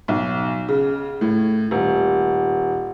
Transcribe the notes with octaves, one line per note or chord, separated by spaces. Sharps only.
B1
C#3
A2
D#1